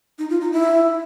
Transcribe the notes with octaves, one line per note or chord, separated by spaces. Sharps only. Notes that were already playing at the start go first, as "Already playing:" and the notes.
D#4
F4
D#4
E4